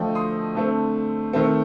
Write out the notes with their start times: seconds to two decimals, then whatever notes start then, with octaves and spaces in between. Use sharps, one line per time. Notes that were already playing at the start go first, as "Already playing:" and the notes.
Already playing: D3 F3 A3 D#5 G5
0.15 C6 D#6
0.55 D3 A3 C4
1.33 D#3 A3 C4